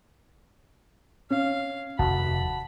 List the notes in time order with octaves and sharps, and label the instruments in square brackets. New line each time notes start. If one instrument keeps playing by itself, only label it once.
[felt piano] C#4 [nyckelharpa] F5
[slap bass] F1 D#2 [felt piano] F#4 F#5 A5 [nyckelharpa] B5